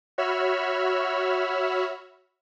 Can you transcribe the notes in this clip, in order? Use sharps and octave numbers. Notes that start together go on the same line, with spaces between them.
F#4 C#5 E5 B5 E6 F6